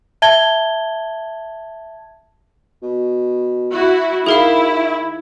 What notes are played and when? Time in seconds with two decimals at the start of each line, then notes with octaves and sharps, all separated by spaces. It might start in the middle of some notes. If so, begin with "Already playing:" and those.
0.22 E5 A5 G#6 G7
2.82 B2
3.72 E4 F#4
4.26 D#3 E4 G#4 A#4 F5